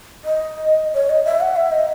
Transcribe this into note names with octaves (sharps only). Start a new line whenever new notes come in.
D#5
C#5
D#5
E5
F#5
E5
D#5